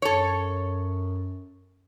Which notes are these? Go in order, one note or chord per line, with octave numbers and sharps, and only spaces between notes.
F#2 A4 C#5